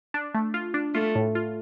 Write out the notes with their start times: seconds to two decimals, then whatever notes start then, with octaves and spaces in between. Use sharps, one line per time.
0.14 D4
0.34 A3
0.54 F4
0.74 D4
0.94 A3 F4
1.15 A2
1.35 F4